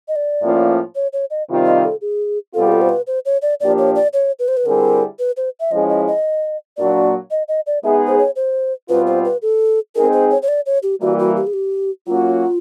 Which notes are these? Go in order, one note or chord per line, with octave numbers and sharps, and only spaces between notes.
D#5
D5
A2 F3 A#3 C#4 F4
C#5
C#5
D#5
C3 D#3 G3 C4 F4
D#5
A4
G#4
B2 G3 C4 F4 A4
G#4
A4
C5
B4
C5
C#5
D5
A#2 F3 A#3 D4 G4 D5
C#5
D5
C#5
B4
C5
B4
D3 G3 C4 E4 G#4 A#4
B4
C5
E5
F3 G#3 C#4 E4 G#4 D#5
D#5
D#5
A#2 F#3 A#3 D4 F#4 D5
D#5
D#5
D5
G#3 B3 D#4 G#4 E5
C5
C#5
C5
B2 G3 C4 F4 B4
C5
B4
A4
G#3 C4 D#4 G#4 A#4
C5
C#5
C#5
D5
C#5
G4
E3 G3 A#3 F#4
F#4
G4
G#4
G4
F#3 A#3 C#4 F4 F#4